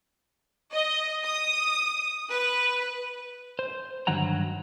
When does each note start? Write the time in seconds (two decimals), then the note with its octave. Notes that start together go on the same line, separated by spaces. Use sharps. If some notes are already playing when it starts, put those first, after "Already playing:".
0.73 D#5
1.23 D#6
2.29 B4
3.59 C5
4.07 G2 D3 D#3 F#3 F#5 A#5